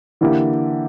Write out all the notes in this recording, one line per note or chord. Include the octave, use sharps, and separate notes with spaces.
D3 E3 A#3 E4 G4